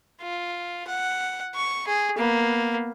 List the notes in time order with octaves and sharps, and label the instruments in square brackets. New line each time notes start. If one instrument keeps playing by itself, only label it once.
[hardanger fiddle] F4
F#5
C#6
G#4
A#3 B3